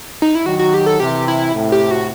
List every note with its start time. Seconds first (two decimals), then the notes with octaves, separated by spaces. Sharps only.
0.22 D#4
0.35 E4
0.46 D#3 F#3 F#4
0.59 F#4
0.74 G4
0.86 A4
1.00 C3 E3 G4
1.28 E4
1.54 A2 C3
1.72 G4
1.91 F#4